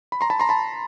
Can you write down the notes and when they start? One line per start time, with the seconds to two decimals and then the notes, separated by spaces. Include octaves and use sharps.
0.12 B5
0.21 A#5 C6
0.30 A5 B5
0.40 A#5 C6
0.49 A5 B5